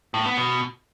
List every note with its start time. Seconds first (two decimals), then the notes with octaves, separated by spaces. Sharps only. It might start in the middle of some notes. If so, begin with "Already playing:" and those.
0.14 A2
0.26 B3
0.38 B2